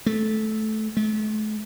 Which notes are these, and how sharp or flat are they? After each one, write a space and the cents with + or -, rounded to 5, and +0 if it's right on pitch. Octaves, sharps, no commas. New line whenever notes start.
A3 -15
A3 -40